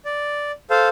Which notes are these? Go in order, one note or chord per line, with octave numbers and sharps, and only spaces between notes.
D5
A4 C5 F5